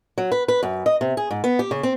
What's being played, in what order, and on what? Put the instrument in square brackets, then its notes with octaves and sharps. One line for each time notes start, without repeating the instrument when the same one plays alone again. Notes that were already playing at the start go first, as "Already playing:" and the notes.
[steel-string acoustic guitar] F#3
B4
B4
F#2
D#5
C3
G#4
G#2
B3
G4
C#3
C4